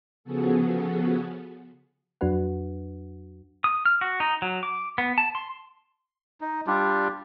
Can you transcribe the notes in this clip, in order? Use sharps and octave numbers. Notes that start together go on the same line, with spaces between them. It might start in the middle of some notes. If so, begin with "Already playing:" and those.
C#3 F3 B3 F#4 G#4 A4
F2 F#3 D4 F#4 B4 F#5
D#6
F6
F#4
D#4
F#3
D6
B3
A5
C6
D#4
G3 D4 F4 G4